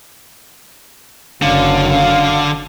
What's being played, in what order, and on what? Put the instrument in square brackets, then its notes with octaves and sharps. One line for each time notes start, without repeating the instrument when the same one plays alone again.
[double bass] F#1 F#2 [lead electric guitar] D3 [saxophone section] F5